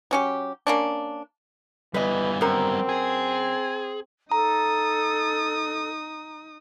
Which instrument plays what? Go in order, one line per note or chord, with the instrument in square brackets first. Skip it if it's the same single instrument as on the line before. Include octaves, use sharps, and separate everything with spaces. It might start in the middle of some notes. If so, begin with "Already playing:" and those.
[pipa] F#3 C#4 G4
A#3 C#4 D4
[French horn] E3 [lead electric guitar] G3 B3 [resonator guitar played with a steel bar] B4 D#5
[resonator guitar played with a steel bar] F#2 A#4 [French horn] C4
[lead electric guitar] G#4
[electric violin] D#4 D#6 [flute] A4 [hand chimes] A#5